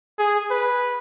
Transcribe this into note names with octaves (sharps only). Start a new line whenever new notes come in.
G#4
B4